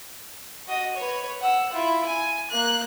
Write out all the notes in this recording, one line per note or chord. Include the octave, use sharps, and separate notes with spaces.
F#4 D#5
B4 C#5
F#5 E6
E4 F4
G#5
A#3 F#6